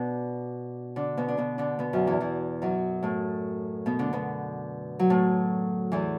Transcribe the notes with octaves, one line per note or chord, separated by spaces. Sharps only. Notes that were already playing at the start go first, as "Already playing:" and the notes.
Already playing: B2 B3 D4
D3 D4
B2 B3
D4
B2 B3
D3 D4
B2 B3
F#2 F#3
E2 E3
E2 E3
F#2 F#3
A2 A3
B2 B3
D3 D4
B2 B3
F#3
A2 A3
E2 E3